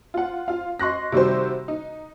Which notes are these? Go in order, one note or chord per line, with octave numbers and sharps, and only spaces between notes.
F4 F#5
F4 F5
D#5 C6 C#6 F#6 A#6
C3 D#3 G3 F#4 G4 C5
D#4